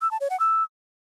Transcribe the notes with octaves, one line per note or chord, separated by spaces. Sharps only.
E6
A5
C#5
F#5
E6